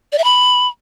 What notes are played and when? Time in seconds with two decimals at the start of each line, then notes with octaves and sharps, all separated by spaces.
0.12 D5
0.18 E5
0.24 B5